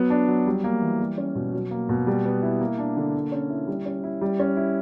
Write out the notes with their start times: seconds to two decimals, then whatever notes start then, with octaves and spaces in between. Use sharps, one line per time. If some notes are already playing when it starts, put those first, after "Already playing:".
Already playing: F#3 B3
0.10 D4
0.28 F#3
0.46 G3
0.64 A#3
0.82 E3
0.99 G3
1.18 C#4
1.35 B2
1.53 F#3
1.71 A#3
1.89 B2
2.07 G3
2.25 B3
2.43 E4
2.61 A#3
2.78 D4
2.97 D3
3.14 A#3
3.32 C#4
3.50 E4
3.67 G3
3.86 C#4
4.04 E4
4.21 G3
4.39 C#4
4.57 E4